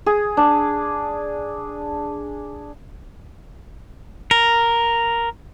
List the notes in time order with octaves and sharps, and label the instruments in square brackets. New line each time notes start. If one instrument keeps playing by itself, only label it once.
[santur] G#4
D4
[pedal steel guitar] A#4